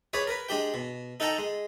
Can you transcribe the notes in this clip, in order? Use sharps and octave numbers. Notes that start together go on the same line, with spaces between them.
G#4 B4 C#5 D5
A#4 B4
G#3 D4 G4 G5
B2
D#4 A4 F#5 G5 A5 A#5
G#3